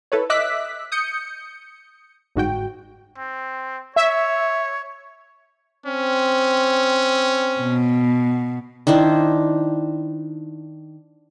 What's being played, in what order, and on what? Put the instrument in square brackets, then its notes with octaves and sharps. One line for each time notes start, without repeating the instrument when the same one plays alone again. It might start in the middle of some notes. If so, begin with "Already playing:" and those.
[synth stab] E4 A4 B4 C#5
D#5 E5 D6 E6 F#6 B6
D#6 G6 C#7
G1 G#2 F#4 G5
[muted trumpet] C4
[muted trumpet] C#5 [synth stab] E5
[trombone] C4 [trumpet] C#4
[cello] B2
[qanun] D#3 D4 E4 C5